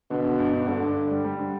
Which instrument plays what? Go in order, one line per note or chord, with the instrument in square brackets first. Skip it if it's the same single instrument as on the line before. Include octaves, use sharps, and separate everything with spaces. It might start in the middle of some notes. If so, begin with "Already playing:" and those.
[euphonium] B2 [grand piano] D3
[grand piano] D3
G2
G2
[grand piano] G2 [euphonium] D3
[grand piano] G2
G2
G3
G3
D3